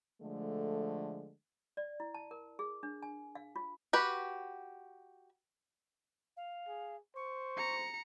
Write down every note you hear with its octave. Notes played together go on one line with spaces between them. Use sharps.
D3 F3 G#3 A3
D5
E4
A5
A#4
G#4
D4
G#5
F5
F4
F#4 G4 B4
F5
G#4
C5 C#6
A#5 C#7